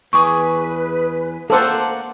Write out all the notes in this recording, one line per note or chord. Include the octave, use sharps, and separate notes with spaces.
E2 G#4 B4 C#6 D6
A#3 A4 C5 D5 F#5